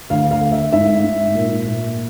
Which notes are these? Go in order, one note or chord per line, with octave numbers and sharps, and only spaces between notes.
D2 F5
F5
A3
E5
G#2 E5
G#2
A#2
A#2